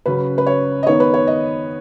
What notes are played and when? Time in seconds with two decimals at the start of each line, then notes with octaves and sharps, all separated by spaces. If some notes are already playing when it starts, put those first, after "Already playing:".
0.06 C#3 F#3 C#4 B4
0.38 B4
0.46 C#5
0.83 D#5
0.86 D#3 B3 C#5
1.00 B4
1.14 C#5
1.27 D#5